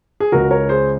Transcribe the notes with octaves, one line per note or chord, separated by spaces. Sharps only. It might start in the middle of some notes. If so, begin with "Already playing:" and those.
G#4
C#2 C#3 G#3 F#4 A#4
A#4 C#5
G#4 C5